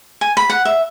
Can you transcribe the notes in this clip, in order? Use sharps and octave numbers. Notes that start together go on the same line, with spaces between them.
G#5
B5
F#5
E5